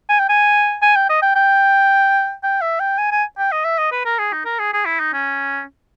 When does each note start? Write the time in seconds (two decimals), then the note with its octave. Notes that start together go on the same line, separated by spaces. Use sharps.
0.10 G#5
0.19 G5
0.29 G#5
0.82 G#5
0.96 G5
1.09 D#5
1.22 G5
1.36 G5
2.43 G5
2.61 E5
2.80 G5
2.98 G#5
3.11 G#5
3.38 G5
3.52 D#5
3.65 E5
3.78 D#5
3.92 B4
4.05 A#4
4.19 G#4
4.33 D#4
4.45 A#4
4.59 G#4
4.73 G#4
4.86 E4
5.00 D#4
5.13 C#4